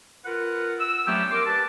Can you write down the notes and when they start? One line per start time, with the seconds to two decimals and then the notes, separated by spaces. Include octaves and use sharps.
0.25 F4 A#4 B4 F#5
0.79 E6
1.06 F#3 A3 B3 C#4 D4 G4
1.31 A#4 C6 D6
1.45 G4 B4 D5 A5